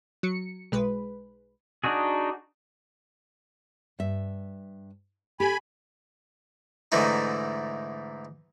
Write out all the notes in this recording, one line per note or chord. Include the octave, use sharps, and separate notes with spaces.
F#3 C#7
B1 G#3 B4
D4 D#4 F#4 G#4
G2 E5
G4 A4 G#5 B5
G#2 D3 E3 A3 D#4